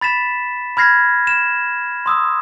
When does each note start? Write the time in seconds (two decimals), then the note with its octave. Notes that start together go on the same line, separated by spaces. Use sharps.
0.01 B5 A6 B6 E7
0.77 B5 F6 G#6 A#6 C7
1.27 E7
2.06 C6 D#6 E6